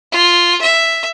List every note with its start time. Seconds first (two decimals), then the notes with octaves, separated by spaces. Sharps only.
0.12 F4
0.61 E5